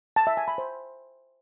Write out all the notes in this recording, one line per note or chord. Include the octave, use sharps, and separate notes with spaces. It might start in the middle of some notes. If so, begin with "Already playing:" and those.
A5
E5
G#5
B5
C5